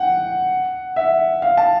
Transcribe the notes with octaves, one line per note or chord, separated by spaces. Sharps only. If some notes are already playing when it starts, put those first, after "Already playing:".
Already playing: F#5 G5
E5
F5
A5